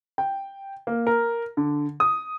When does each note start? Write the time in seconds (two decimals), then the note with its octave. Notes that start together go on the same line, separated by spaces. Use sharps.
0.18 G5
0.87 A#3
1.07 A#4
1.57 D3
2.00 D#6